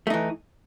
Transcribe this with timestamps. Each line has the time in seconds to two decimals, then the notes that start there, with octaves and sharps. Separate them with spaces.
0.07 A3
0.10 D#4
0.14 E3